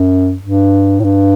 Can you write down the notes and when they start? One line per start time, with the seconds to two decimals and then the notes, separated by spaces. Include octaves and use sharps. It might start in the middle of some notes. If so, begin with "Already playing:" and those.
Already playing: F#2
0.42 G2
1.00 A2
1.04 G2